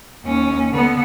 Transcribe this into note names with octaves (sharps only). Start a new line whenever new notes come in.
D#2 C#4
D3 B3